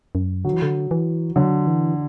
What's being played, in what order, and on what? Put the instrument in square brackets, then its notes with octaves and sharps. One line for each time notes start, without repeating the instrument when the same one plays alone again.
[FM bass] F#2
[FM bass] D3 [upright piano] F#3
[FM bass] E3
D3
E3
[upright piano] D3 [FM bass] F#3
[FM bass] E3